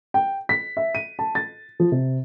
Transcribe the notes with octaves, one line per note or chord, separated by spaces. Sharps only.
G5
B6
E5
D#7
A5
A6
F3
C3